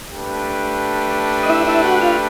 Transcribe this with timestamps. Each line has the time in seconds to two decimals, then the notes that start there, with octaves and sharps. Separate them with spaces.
0.13 A3 D4 G4 B4
1.43 D#5
1.50 E4 E5
1.67 E4 E5
1.84 F#4 F#5
2.01 F4 F5